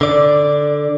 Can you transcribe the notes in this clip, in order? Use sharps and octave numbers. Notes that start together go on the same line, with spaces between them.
D3 D5